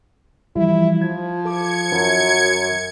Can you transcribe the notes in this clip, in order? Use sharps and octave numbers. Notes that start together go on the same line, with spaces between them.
E3 F3 G3 E4
F3 G#6
A4 D6 G#6 C#7
F#2 D#3